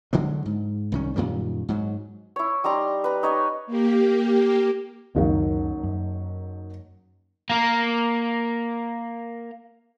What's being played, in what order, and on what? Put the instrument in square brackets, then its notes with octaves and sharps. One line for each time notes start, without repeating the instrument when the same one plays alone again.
[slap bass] D3 F#3 G#3
G#2
C2 D#3 C#4
F#2 A#2 D#3 G3
G#2 F#3
[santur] E4 C#5
G3 D#4 A#5 C6
B4 A#5
D#4 C#5 D#5 G#5
[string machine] A#3 G4
[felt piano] F#1 D#3 F#3 [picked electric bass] C#2 F#2
[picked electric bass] F#2
[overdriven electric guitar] A#3 A#4